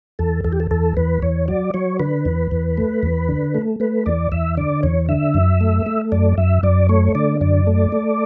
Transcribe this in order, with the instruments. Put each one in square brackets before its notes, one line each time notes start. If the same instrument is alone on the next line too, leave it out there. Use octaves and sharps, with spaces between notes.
[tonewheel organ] E2 A4
E2 A4
G4
A4
E2 A4
E2 B4
E2 C#5
F#3 D5
F#3 C#5
D3 B4
E2
E2
A3
E2
D3
A3
A3 B4
E2 D5
E2 E5
D3 D5
E2 C#5
D3 E5
F#2
A3
A3
F#2 D5
F#2 E5
F#2 D5
A3 C#5
D3 D5
F#2 D5
A3
A3